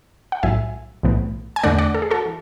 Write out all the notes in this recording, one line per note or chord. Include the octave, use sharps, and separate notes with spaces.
F#5
B1 A2 F#3 E5 G#5
B1 A2 E3 B3
G#5
E2 D3 A3 D5 F#5
D5 F#5
A4
G#4
F#4 A4
E3